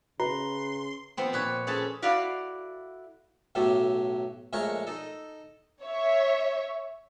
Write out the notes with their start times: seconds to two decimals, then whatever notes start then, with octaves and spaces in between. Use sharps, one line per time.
0.20 C#3 B4 A#5 C6
1.17 F3 B3 C4
1.33 A#2 B4 C#5
1.67 C#4 F4 G#4 A4 B4 A5
2.02 E4 F#4 A4 D5 F5
3.55 B1 A2 F#3 G4 A4
4.53 A#1 G#3 A3 A#4 C#5 C#6
4.87 D#4 A4
5.83 C#5 E5